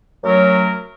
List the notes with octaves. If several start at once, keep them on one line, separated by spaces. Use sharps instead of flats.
F#2 F#3 A3 A#4